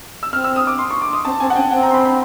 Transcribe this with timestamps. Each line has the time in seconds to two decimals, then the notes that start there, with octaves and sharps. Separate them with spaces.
0.23 E6
0.33 C4 F6
0.44 E6
0.56 D#6
0.67 D6
0.79 C6
0.91 C#6
1.02 D6
1.13 D#6
1.25 C4 A5
1.40 C4 G#5
1.50 F#5
1.56 C#4 G5
1.71 C4 F#5
1.83 A#5
1.90 C6
1.94 B5
2.05 B5